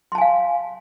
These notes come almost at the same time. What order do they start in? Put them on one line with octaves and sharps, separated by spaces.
C6 A5 G#5 F5